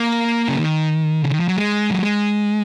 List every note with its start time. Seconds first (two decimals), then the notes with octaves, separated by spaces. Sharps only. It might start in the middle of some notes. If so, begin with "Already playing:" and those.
Already playing: A#3
0.48 C#3
0.59 D#3
1.22 C#3
1.31 D#3
1.40 F3
1.48 F#3
1.57 G#3
1.91 F#3
2.02 G#3